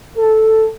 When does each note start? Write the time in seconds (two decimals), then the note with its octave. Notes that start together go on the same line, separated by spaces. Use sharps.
0.17 A4